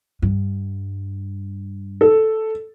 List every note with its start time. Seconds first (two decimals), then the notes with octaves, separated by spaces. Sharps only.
0.22 G2
2.01 A4